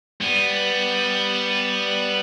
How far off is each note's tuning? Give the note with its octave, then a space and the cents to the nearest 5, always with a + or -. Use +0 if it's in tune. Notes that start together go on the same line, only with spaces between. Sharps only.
G3 +0 B3 +0